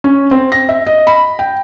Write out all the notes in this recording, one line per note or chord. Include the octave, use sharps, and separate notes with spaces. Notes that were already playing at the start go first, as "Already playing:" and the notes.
C#4
C4
A#6
E5
D#5
B5
G5